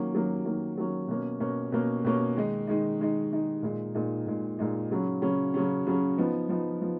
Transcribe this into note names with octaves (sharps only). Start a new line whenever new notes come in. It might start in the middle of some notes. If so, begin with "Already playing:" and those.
Already playing: D#3 F#3 A#3 C#4
D#3 F#3 A#3 C#4
D#3 F#3 A#3 C#4
D#3 F#3 A#3 C#4
B2 A#3 C#4
B2 A#3 C#4
B2 A#3 C#4
B2 A#3 C#4
D#3 G#3 D#4
D#3 G#3 D#4
D#3 G#3 D#4
D#3 G#3 D#4
A#2 G#3 D#4
A#2 G#3 D#4
A#2 G#3 D#4
A#2 G#3 D#4
C#3 F#3 C#4
C#3 F#3 C#4
C#3 F#3 C#4
C#3 F#3 C#4
F3 B3 D#4
F3 B3 D#4
F3 B3